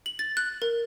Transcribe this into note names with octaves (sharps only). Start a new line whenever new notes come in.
F#7
A6
F#6
A#4